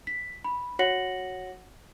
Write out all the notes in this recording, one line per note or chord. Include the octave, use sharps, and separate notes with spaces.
B6
B5
F#4 C#5 F#5 A#6 C#7 F#7